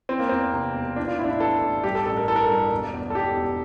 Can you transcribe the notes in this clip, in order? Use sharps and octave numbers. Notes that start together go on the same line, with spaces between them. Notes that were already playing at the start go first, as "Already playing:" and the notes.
E3 C4
A#3
E2 C4
C3
E1
E3 D4
F4
A1 E4
D4
E4
E3 A4
A1
G2 G4
A4
A1 A4
A#4
E3 A4
A#4
G2 A4
E1
E2
A4
E2 G4
E1